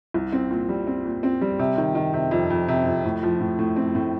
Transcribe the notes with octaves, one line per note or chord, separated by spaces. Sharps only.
C2
C4
A#2
G3
C4
A#2
C4
G3
C3
D#3
D#3
C3
F2
F2
C3
F2
A2
F3
A2
A2
C4
A2